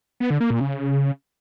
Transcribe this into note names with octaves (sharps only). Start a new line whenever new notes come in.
B3
D3
A#3
A#2
C#3